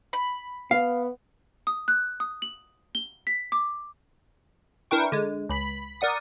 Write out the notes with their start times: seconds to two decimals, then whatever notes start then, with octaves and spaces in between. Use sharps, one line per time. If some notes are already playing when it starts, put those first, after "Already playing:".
0.13 B5
0.71 B3 F5
1.67 D#6
1.88 F#6
2.20 D#6
2.42 F#7
2.95 G7
3.27 B6
3.52 D6
4.91 D4 E4 A#4 B4 G5 C#6
5.12 D3 G#3
5.49 C#2 B5 B6
6.01 A#4 D5 F#5 D#6